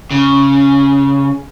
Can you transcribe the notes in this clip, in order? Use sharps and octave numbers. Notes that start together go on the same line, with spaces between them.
C#3